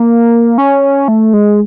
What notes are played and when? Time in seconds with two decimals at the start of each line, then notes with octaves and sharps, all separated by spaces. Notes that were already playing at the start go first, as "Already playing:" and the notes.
Already playing: A#3
0.58 C#4
1.08 A3
1.33 G#3